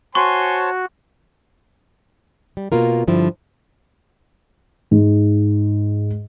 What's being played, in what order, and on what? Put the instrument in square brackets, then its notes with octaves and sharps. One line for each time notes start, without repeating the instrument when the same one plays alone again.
[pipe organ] F#4 [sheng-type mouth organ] C5 C#5 A5 [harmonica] G#5 C6 [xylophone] C#6
[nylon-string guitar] G3
B2 A#3 F4 A#4
G2 D3 F3 E4
[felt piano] G#2